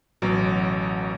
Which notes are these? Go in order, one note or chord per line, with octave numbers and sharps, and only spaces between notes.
A1 B2 F#3